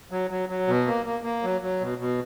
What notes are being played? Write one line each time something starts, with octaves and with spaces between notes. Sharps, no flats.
F#3
F#3
F#3
B2
A#3
A#3
A#3
F#3
F#3
B2
B2